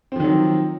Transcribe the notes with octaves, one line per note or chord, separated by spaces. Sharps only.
D#3 F3 F#3 C4